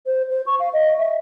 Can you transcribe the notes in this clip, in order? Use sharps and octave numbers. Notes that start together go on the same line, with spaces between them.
C5
C5
C#6
F5
D#5
E5